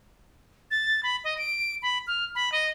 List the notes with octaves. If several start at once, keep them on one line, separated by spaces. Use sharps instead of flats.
A6
B5
D#5
D7
B5
F6
B5
D#5